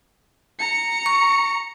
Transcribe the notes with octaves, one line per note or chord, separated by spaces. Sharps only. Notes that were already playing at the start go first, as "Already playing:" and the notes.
A#5 C#7
C#6